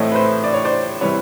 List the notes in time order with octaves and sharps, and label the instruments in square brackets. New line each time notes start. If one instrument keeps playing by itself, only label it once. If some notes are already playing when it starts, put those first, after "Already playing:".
Already playing: [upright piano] A2 E3 A3 C4 C#5 D#5
B4
C5
D5
C#5
C5 D5
C3 E3 G3 B4 C#5